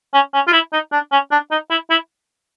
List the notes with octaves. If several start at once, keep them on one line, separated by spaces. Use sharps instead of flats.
C#4
C#4
F4
E4
D#4
D4
C#4
D4
D#4
E4
E4